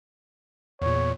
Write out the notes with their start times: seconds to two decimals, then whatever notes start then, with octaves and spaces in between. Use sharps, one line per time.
0.82 E2 A#2 C#5